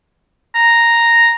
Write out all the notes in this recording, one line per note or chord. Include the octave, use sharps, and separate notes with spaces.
A#5